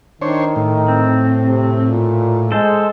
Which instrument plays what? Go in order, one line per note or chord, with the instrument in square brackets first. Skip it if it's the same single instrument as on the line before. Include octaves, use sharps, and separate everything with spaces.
[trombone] D#3 [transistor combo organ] D4 C5 C#5
[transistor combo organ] A2
[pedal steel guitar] C4
[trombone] C3
A#2
[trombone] G#3 [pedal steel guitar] A4 C5